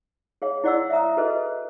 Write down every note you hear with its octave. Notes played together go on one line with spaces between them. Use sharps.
G#4 C#5 F5
E4 C5 D5 F#5 C6 E6
E5 F5 A#5 D#6
F#4 G#4 A4 B4 C5 D#5